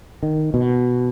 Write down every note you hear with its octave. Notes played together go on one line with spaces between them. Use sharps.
D#3
B2